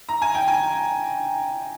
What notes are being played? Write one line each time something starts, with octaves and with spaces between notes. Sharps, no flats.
A#5
G#5
G5
G#5